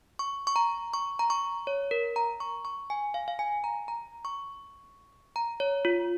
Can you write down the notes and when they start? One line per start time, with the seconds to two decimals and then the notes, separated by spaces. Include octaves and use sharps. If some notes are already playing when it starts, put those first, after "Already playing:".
0.19 C#6
0.47 C#6
0.56 A#5
0.94 C#6
1.19 A#5
1.30 C#6
1.67 C#5
1.91 A#4
2.16 A#5
2.40 C#6
2.65 C#6
2.90 G#5
3.14 F5
3.28 F5
3.39 G#5
3.64 A#5
3.88 A#5
4.25 C#6
5.36 A#5
5.60 C#5
5.85 F4